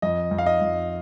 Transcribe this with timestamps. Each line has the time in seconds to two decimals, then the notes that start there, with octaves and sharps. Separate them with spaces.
0.02 F2 D#5
0.31 F2
0.38 F5
0.46 D#5
0.61 F2